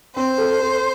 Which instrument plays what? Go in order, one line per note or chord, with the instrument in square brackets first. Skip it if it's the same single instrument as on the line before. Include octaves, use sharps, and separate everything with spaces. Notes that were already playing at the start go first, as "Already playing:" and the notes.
[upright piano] C4 [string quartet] C5
[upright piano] A4
A4